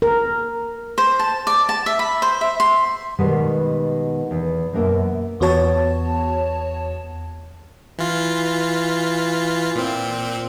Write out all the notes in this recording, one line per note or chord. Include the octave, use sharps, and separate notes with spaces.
A#4
C5
A5
D5
A5
E5
B5
C5
E5
C6
B2 D#3 G3 G#3 B3 B4
E2
F#2 B2 A#3 A#4 E5
E2 B3 F#4 C#5 A5
E3 F4
A#2 C4